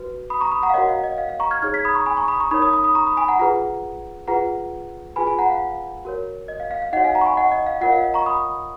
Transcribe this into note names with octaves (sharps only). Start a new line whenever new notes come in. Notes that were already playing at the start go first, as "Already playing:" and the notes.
Already playing: F#4 B4
B5 D#6
A#5 C#6
B5 D#6
F#5 A#5
F5
F#4 A#4 C#5 D#5 F#5
F5
D#5
F5
F5
A#5 C#6
F6 G#6
D#4 G#4 C#5 F6 G#6
G#6 B6
B5 D#6
A#5 C#6
G#5 B5
A#5 C#6
B5 D#6
A#5 C#6
D#4 A#4 C#5 B5 D#6
B5 D#6
B5 D#6
B5 D#6
A#5 C#6
B5 D#6
G#5 B5
F#5 A#5
F4 G#4 B4 F#5 A#5
F4 G#4 B4 F#5 A#5
F4 G#4 B4 G#5 B5
G#5 B5
F#5 A#5
F5
F#4 A#4 C#5
D#5
F5
F5
F5
D#4 F#4 C#5 D#5 F#5
F5 G#5
F#5 A#5
C#6
G#5 B5
D#5 F#5
D#5
F5
F4 A#4 C#5 D#5 F#5
F5
D#5
A#5 C#6
B5 D#6